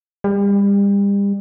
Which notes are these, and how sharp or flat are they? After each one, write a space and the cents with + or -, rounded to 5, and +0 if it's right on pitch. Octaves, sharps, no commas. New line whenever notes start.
G3 +35